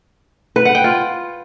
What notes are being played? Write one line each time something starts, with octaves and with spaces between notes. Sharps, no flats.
B4
F#5
G5
F4